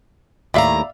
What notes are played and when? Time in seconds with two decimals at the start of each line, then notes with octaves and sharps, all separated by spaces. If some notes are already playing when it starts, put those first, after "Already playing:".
0.54 D#2 A2 D5 E5 F5 A#5